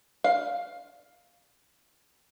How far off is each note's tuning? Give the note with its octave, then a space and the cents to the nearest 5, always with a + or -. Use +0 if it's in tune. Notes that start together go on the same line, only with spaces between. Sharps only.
F5 +5